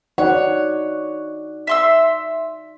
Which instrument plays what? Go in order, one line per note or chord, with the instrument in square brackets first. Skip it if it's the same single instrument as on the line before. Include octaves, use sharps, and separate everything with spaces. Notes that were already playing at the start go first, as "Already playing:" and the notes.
[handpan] D#4 D5 F#5 [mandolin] C#5
[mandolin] E5 C6 E6